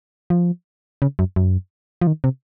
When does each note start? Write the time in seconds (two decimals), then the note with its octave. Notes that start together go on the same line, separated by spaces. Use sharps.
0.30 F3
1.02 C#3
1.19 F#2
1.36 F#2
2.02 F3
2.07 D#3
2.24 C3